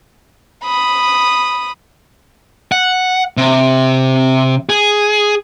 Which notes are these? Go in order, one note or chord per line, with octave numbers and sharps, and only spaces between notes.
B5 D#6
F#5
C3
G#4